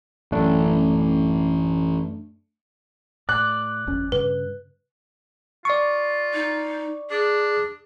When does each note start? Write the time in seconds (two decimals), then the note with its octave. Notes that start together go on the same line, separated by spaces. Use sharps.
0.32 A1 F#2 A3 D4
3.29 A2 D5 F#6
3.87 G1 F2 C#4
4.12 G2 C#3 B4
5.65 F4 D5 C#6
6.34 D#4
7.10 D4 G#4